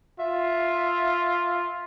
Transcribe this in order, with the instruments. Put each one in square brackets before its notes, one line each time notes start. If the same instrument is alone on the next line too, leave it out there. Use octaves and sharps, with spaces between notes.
[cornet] F4 [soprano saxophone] E5